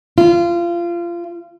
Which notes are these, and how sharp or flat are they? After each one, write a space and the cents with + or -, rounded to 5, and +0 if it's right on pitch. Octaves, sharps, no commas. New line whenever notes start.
F4 -25